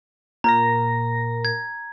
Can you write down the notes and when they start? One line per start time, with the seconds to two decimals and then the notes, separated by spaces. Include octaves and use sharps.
0.44 A#2 A#4 A#5 A#6
1.45 G#6